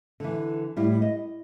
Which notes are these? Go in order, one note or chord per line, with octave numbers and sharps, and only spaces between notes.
D3 E3
A2 G3 E4
D#5